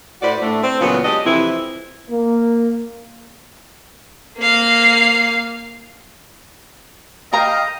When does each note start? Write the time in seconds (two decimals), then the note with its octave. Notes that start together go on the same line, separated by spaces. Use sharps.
0.22 A2 F#4 B4 C5 D5
0.42 A2 A3 D4
0.64 C4
0.81 A#2 C#3 E3 F#3 B3 F4
1.04 G#3 D4 G4 D#5
1.25 F2 C3 E3 C4 E4
2.10 A#3
4.38 A#3 F5
7.33 A#4 D#5 F5 G5 A#5